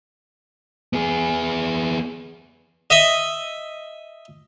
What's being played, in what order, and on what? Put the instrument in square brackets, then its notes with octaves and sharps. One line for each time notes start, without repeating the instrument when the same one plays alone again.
[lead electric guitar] B3 G#4
[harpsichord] D#5 E5